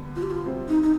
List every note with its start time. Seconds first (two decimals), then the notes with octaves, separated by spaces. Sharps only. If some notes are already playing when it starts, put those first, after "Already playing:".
Already playing: D3 G3 B3
0.16 F4
0.23 G4
0.31 F4
0.45 C3 G3 C4
0.68 D#4
0.83 D#4